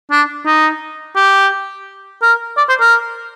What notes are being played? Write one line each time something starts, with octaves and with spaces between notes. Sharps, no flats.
D4
D#4
G4
A#4
D5
C5
A#4